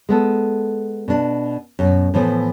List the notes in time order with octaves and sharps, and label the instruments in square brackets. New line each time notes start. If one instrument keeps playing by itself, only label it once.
[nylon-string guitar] G#3 B3 A4
B2 D4
F#2 B2
A2 E3 F3 B3